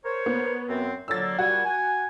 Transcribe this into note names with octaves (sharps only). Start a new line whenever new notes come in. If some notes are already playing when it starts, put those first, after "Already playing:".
A#4 C5 C#5
B3
F#2 C4
D3 F#3 A#3 E6 A6
A#2 G3 F#4 G#5
G#5